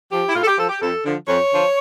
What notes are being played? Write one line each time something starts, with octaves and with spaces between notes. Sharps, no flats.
F3 G4
E4
A2 F4
A4
G4
F3 A4
G4
F2 A4
D3 F3
F2 C#5
D3 F3